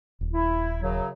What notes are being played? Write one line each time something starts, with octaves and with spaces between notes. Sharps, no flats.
D#1
E4
F#2 C#3 F#3